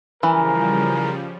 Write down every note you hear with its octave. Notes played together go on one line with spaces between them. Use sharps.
C#3 E3 F3 G3 A#4 G#5 B5